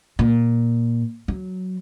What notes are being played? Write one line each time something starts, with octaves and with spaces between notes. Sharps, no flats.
A#2
F#3